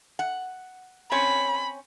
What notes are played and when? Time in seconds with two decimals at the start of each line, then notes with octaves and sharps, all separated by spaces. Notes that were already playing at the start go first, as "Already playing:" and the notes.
0.19 F#5
1.12 C4 C#4 C#5 B5